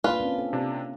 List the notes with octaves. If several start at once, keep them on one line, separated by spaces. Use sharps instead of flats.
A#3 D4 F4 B4
C4 C#4
A4
C3 D4